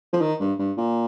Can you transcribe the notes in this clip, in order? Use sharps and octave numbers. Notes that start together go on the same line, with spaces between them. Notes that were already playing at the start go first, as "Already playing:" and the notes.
F3
D#3
G2
G2
A#2